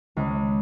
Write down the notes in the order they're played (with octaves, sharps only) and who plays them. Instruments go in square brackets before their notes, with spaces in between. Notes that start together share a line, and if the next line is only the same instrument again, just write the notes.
[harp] C#2